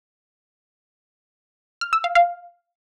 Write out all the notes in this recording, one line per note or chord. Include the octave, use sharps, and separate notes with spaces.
F6
E6
F5
F5